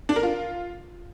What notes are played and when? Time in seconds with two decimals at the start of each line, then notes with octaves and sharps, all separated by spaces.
0.09 D4
0.16 A#4
0.23 F4